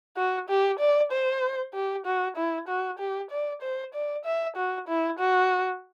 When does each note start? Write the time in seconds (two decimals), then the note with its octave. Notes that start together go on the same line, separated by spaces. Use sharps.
0.16 F#4
0.49 G4
0.79 D5
1.12 C5
1.74 G4
2.06 F#4
2.36 E4
2.68 F#4
2.99 G4
3.31 D5
3.62 C5
3.94 D5
4.25 E5
4.56 F#4
4.88 E4
5.19 F#4